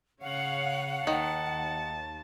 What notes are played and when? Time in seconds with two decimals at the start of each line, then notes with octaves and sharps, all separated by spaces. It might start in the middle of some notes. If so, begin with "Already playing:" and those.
0.22 C#3 C#5 F5 F#5
1.07 D#2 D#3 A5